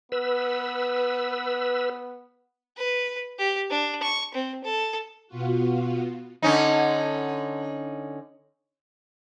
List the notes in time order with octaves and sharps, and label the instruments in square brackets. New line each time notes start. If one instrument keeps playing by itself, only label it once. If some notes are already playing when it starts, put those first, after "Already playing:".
[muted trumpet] B3 [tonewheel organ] B4 E6
[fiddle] B4
G4
D4
C#6
C4
A4
[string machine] B2 B3 F4 F#4
[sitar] D3 C#4 D#4